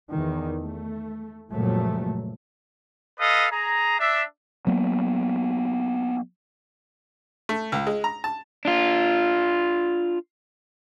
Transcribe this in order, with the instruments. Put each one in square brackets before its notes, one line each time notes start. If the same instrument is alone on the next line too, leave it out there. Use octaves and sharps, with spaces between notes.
[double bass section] E2 D#3
A3
F#1 C#2 A#2 F3 F#3 A3
[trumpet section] A4 B4 D#5 F5
G#4 A#5
D4 E5
[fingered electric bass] F#3 A#3 B3
[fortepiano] A3
C#2
G#3
A#5
A5
[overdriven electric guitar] D4 F4